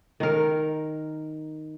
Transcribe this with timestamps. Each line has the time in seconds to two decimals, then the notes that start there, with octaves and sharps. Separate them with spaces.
0.20 D#3 A#4